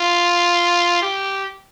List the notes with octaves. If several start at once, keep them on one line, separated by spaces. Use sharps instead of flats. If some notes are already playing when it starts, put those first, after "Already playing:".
Already playing: F4
G4